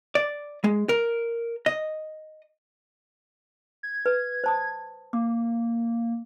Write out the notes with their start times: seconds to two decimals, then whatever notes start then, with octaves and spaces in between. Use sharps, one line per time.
0.15 D5
0.64 G#3
0.89 A#4
1.66 D#5
3.83 G#6
4.06 B4
4.44 C5 A5 D#6
5.13 A#3 D6